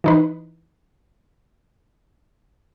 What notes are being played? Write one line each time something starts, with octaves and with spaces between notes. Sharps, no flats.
E3 D#4 B4